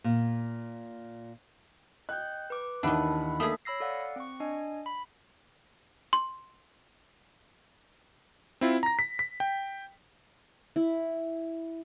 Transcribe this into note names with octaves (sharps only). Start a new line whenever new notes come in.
A#2
D#5 G5 F#6 G6
B4 D6
D#2 D#3 E3 D4 E5 F#5 A5 B5
A3 A#3 D4 G#4 A4 D#6 B6
C#5 B5 E6 A#6 C7
A4 D5 F5 F#5
C4 C#6
D4 D#5 G#5
B5
C6
C4 E4 F4
A#5 A#6
B6
B6
G5
E4